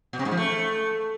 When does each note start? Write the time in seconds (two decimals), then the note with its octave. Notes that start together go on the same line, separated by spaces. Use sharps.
0.13 B2
0.19 C3
0.25 G#2
0.31 F3
0.37 A3